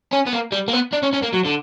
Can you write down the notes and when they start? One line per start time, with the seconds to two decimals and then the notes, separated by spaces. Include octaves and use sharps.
0.13 C#4
0.27 B3
0.33 A#3
0.52 G3
0.68 A#3
0.73 B3
0.93 D4
1.03 C#4
1.13 C#4
1.22 A#3
1.33 F#3
1.45 D3